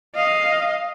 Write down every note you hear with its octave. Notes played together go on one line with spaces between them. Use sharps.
D#5 F5